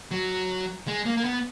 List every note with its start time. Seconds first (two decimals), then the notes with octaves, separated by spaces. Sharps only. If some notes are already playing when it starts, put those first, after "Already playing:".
0.11 F#3
0.87 G#3
1.06 A#3
1.17 A#3
1.24 B3